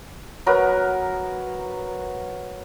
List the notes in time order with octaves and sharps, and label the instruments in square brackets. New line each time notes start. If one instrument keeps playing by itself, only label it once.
[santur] F#3 B3 A#4 B4